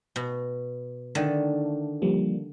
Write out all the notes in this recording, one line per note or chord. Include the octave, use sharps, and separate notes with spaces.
B2
D3 D#3 A3
F3 G3 A#3